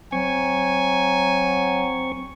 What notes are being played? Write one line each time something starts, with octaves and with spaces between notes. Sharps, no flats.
F#3 C4 G#5 C#6